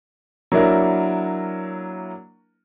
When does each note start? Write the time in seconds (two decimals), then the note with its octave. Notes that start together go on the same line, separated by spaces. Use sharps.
0.52 F#3 A#3 D4 E4 A#4